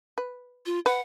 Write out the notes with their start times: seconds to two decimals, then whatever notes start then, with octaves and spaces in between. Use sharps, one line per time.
0.18 B4
0.66 F4
0.86 B4 F#5